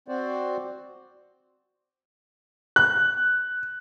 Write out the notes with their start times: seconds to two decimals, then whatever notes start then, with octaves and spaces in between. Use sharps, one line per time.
0.08 C4 F#4 C5 D5
2.76 F#6